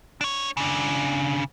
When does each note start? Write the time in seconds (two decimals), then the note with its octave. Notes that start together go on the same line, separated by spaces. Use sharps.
0.21 D4 C#5
0.57 C#3 D4